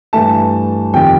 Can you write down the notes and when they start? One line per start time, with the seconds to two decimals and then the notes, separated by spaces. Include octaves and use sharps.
0.13 G2 E3 A3 A5
0.93 F2 C3 D#3 G3 G5